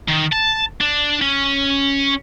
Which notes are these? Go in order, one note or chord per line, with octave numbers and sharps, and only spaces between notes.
D#3
A5
D4
C#4